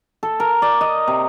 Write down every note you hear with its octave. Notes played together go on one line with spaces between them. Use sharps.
A4
A#4
D5
D#5
C3